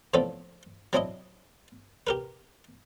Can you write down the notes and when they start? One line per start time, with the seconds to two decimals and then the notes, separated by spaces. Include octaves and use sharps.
0.14 A2 F3 B3 C4 D4 A4
0.93 F#3 C4 D4 E4 D#5
2.07 G4 A#4 B4